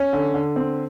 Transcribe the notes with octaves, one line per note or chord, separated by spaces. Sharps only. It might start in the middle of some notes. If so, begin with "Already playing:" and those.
Already playing: C#4
D3
D3
C4